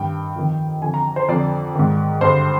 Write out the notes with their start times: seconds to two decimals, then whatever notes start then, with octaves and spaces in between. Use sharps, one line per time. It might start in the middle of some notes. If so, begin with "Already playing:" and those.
Already playing: G2 D#3 G5
0.36 F2 D#3
0.82 F2 D3 G#5
0.94 A#5
1.16 C5
1.29 F2 D3 D5
1.75 G#2 D#3
2.21 G2 D3 C5